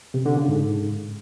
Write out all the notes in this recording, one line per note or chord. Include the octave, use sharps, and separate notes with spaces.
C3
D3
C#3
G#2